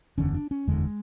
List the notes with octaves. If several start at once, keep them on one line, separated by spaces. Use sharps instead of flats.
F#1 E2 D3 C#4
D4
C#4
F#1 E2 D3 G#3